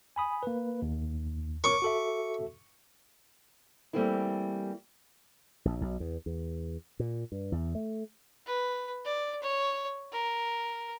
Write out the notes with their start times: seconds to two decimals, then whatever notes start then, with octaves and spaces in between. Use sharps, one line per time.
0.16 G#5 B5 D#6
0.43 A#3 B4
0.82 D#2
1.64 A#4 C#5 C#6 D6
1.82 F#4 A4 E5
3.93 E3 G3 A3 A#3 C4 E4
5.65 A#1
5.81 B1
6.00 E2
6.26 E2
6.99 A#2
7.32 G2
7.52 E2
7.75 A3
8.46 B4
9.05 D5
9.42 C#5
10.12 A#4